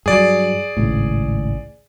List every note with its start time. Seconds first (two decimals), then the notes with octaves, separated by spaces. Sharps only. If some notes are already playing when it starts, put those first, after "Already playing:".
0.06 G2 F#3 G#4 D5
0.77 G#1 C#2 A2